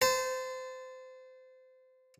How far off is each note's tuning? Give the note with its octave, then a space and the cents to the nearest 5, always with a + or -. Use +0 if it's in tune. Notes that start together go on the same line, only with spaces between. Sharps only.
C5 -25 A5 +0